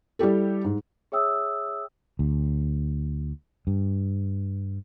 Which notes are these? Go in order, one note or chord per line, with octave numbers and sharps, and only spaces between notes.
G3 E4 G4 A4
G#2
G#4 C#5 E5 G5 D#6 E6
D2
G2